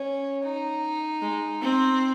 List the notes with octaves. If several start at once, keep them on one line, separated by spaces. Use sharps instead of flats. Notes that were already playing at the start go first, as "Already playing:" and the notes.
Already playing: C#4
D#4
G#3
C4